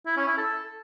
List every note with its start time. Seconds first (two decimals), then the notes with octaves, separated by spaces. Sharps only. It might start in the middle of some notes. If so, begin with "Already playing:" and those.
0.06 E4
0.17 C#4
0.27 E4
0.38 A4